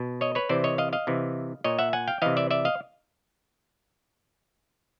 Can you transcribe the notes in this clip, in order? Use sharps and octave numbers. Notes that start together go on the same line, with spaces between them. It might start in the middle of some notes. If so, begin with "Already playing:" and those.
Already playing: B2
C#5 D#5
B4 C#5
C3 E3 C5 D5
C#5 D#5
D#5 F5
D#5 F5
C3 E3
A#2 C#5 D#5
E5 F#5
F#5 G#5
F5 G5
C3 E3 D#5 F5
D5 E5
D5 E5
D#5 F5